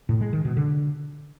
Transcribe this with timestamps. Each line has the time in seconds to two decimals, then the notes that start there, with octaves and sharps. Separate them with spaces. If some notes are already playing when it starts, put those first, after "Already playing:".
0.09 A2
0.21 G#3
0.33 D#3
0.45 B2
0.57 D3